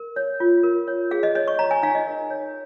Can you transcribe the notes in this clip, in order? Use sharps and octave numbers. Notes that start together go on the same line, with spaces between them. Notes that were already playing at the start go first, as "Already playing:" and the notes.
Already playing: A#4
C#5
F4
A#4
C#5
G#4 F5
D#5
C#5 D#5
C#6
C#5 A#5
G#5
D#4 F5
D#5
A#4
C#5